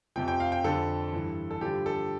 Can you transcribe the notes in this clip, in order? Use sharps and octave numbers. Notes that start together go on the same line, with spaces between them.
F2 C3 F3 G5
G5
F5
G5
F2 D3 F3 A4
G2 E3
A4
G2 D3 F3 G4
A4